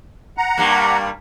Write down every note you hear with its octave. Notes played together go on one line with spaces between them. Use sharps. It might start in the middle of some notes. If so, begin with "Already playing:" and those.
F#5 A#5
G2 G3 A#3